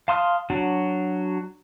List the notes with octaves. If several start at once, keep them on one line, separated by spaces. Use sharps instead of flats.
F5 A5 C6 D#6 F6
F#3 D4 F#4